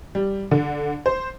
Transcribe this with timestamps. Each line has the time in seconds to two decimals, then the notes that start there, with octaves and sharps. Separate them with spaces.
0.15 G3
0.51 D3
1.06 C5